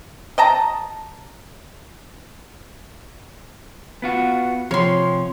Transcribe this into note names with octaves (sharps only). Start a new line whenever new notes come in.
D#5 A5 A#5
B3 F4 F#4
C3 F3 C#5 C6